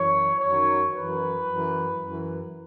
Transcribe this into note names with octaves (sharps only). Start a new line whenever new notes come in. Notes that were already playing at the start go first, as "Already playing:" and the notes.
Already playing: F#2 E3 C#5
F#2 D#3 F#3 C#5
F#2 E3 B4
F#2 E3
F#2 E3